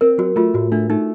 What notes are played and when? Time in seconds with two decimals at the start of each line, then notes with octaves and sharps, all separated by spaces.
0.01 C4 A#4
0.18 F#3 F#4
0.36 A3 F4
0.54 A2 F#4
0.72 A3 D4
0.90 A3 D#4